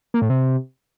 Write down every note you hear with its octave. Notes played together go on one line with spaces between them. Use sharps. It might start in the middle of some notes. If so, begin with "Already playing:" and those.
A#3
A2
C3